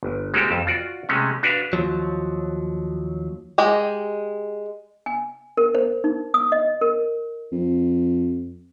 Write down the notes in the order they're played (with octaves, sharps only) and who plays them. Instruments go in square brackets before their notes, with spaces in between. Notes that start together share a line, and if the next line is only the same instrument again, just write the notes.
[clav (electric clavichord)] G1
G#3 A#3 C4 F#4 G4 A4
F2 A5
F4 F#4 D5
C3 G#3 A3 C#4
D4 F#4 B4 E5 F5
[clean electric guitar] D#2 F3 F#3
[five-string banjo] G#3 G4 D#5
[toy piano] G#5
A#4
C5
D#4
D#6
D#5
A#4
[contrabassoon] F2